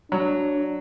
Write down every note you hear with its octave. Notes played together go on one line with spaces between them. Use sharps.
F#3 D4